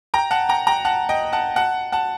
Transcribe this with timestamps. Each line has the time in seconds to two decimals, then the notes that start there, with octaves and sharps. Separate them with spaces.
0.14 G5 A#5
0.31 F#5 A5
0.49 G5 A#5
0.67 G5 A#5
0.85 F#5 A5
1.09 D#5 G5
1.32 F#5 A5
1.56 F#5 A5
1.92 F#5 A5